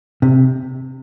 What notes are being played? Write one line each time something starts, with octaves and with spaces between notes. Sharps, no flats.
C3